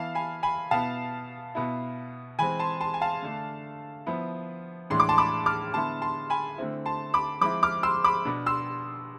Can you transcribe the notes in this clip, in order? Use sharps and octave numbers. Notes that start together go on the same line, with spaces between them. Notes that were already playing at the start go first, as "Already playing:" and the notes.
Already playing: E3 B3 E4 F5 A5
G#5 B5
G#5 B5
B2 B3 E4 F5 A5
B2 B3 E4
E3 G#3 C4 G#5 B5
A5 C6
A5 C6
G#5
F5 A5
D3 A3 D4
F3 B3 E4
A2 E3 G#3 D4 C6
D6
A5 C6
B5 D6
D6 F6
D3 G#3 B3 E4 A5 C6
A5 C6
G#5 B5
D3 A3 C4 E4
A5 C6
B5 D6
F3 G#3 C4 E4 B5 D6
D6 F6
C6 E6
B5 D6
B2 B3 D4
C6 E6